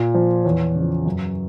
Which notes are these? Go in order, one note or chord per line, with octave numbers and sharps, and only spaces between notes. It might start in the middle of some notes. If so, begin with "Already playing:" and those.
Already playing: A#2
F3
E2 C#5
C#3 F3
F#2